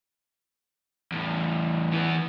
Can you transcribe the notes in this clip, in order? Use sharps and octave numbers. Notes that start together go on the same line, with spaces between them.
E2 A2
E3 B3